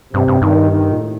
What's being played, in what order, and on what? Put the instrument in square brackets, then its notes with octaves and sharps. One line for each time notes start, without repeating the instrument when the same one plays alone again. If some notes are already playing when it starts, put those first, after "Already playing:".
[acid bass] G2 [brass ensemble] C3
[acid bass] G2
[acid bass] G2 [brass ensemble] D#3
[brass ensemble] D#3
[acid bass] A#2
A2